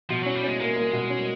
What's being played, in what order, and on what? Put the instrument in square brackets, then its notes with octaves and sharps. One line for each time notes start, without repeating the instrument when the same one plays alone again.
[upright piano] B2 [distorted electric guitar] F3
[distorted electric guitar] F#3 [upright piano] C#4
[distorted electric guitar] G3
[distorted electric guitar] G#3 [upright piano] C#4
[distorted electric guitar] G#3 [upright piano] A#3
[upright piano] A#3
B2
C#4